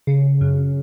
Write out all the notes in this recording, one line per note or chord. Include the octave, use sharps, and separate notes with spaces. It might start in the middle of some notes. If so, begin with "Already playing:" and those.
C#3
F#2